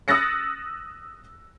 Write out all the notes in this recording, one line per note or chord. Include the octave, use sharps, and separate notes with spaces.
D#6 E6 F#6 A6 A#6 C#7